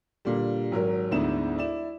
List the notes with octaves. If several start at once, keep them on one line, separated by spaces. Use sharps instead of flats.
A#2 D3 G3
G#1 F#3 A#4
D2 G#2 B3 D4 E4 E7
E4 D5 E7